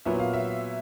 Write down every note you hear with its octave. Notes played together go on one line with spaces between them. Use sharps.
A#2 F#3 B3 E5
F5
E5